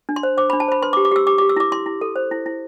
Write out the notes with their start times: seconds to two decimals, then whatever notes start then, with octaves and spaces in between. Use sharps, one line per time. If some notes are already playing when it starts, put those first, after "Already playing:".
0.09 D4
0.16 C6
0.23 C5
0.37 C5 D6
0.50 B5
0.53 D4
0.60 A5
0.68 C5 B5
0.82 B4 C6
0.93 D6
0.97 G4
1.05 D6
1.12 G4 E6
1.27 G4 D6
1.38 D6
1.41 G4
1.49 E6
1.57 E4 D6
1.72 E4 C6
1.86 E4
2.01 A4
2.16 C5
2.31 E4
2.46 E4